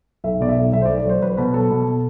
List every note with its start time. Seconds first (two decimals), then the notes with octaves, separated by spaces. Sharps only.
0.24 B1 E5
0.41 B2 D5
0.48 E5
0.56 B1
0.72 B1 E5
0.81 C5
0.86 D5
0.89 A3
0.98 D5
1.05 F#3 C5
1.21 F#3 B4
1.32 C5
1.37 B2 B4
1.54 F#3 A4
1.70 B2